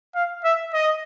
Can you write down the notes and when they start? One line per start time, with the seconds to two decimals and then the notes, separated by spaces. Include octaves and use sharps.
0.15 F5
0.45 E5
0.74 D#5